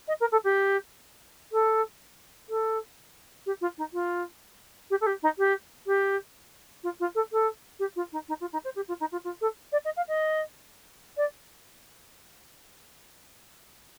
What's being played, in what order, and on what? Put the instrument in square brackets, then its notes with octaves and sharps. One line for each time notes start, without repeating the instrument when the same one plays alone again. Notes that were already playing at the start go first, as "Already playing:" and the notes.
[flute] D#5
A#4
A4
G4
A4
A4
G4
F4
D#4
F4
G4
A4
G4
D#4
G4
G4
F4
F4
A4
A4
G4
F4
D#4
D#4
F4
D#4
C5
G4
F4
D#4
F4
F4
A4
D5
D#5
F5
D#5
D5